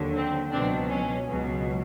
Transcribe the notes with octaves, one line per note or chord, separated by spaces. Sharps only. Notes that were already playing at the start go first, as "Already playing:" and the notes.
Already playing: D#2 D3 F#3
C4
C#2 B2 F#3 C4 D4
C#4
C#2 B2 F#3